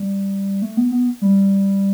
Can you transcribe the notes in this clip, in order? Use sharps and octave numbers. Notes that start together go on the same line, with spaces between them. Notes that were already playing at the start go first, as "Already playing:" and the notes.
Already playing: G3
A3
B3
B3
G3